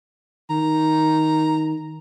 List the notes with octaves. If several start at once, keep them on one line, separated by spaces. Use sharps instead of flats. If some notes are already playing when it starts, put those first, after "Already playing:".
D#3 A#5